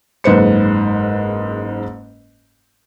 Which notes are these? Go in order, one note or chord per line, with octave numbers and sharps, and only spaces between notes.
F#1 G#2 B4 C5 C#7